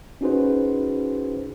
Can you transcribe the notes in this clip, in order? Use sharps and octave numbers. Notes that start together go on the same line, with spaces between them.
C#4 D#4 F#4 G#4 B4 C5